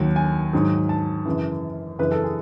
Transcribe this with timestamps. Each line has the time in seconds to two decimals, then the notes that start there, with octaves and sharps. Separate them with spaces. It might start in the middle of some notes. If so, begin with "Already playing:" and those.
Already playing: D#2 D#3 F#3
0.16 G#5
0.53 G#2 D#3 F#3
0.89 A5
1.25 F#2 C#3 E3
1.99 F#2 C#3 E3 B4
2.12 A4
2.23 G#4